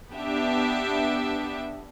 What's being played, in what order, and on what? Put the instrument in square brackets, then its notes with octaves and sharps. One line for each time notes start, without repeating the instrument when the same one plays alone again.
[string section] B3 D4 G4 E5